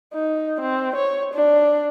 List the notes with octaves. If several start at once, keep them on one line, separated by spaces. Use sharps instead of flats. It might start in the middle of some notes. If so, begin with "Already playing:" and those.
D#4
C4
C#5
D4